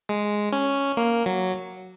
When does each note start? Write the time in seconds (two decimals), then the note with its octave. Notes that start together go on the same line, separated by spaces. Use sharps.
0.09 G#3
0.52 C#4
0.97 A#3
1.26 F#3